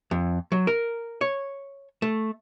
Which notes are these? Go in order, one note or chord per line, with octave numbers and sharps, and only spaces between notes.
F2
F#3
A#4
C#5
A3